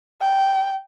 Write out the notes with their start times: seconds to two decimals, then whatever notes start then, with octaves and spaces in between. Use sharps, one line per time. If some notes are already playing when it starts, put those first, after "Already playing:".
0.21 G5